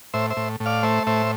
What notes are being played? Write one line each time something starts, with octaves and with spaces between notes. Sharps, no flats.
A2 C5 E5
C5 E5
A2
A2
D5 F5
A3 C5 E5
A2 C5 E5